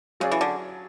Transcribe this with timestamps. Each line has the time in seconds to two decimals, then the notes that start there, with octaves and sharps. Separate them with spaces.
0.20 C#3 F#3 C#4 G#4 D5
0.32 E3
0.41 D3